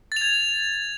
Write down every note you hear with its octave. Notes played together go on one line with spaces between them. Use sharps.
G#6 A6 F7